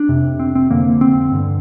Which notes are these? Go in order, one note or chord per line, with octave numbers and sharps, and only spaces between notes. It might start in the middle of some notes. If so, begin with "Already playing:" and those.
Already playing: D4
F2 C3
C4
C4
F2 D3 A#3
C4
G2 D3